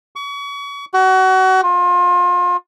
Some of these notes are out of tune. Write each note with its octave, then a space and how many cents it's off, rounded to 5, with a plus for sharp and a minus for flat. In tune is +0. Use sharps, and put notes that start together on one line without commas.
C#6 +35
F#4 +30
F4 +30